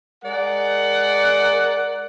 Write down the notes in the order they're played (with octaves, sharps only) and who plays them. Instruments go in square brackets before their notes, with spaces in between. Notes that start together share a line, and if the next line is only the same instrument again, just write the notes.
[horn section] G#3 A#4 D5 F#5